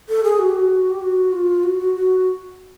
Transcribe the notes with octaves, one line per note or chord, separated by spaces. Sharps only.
A4
G#4
F#4
G4
F#4
G4
F#4
F4
F#4
F#4
F#4